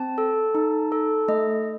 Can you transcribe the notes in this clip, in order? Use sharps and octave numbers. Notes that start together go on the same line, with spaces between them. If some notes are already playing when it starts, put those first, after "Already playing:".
Already playing: C4 A5
A4
D#4
A4
A3 D#5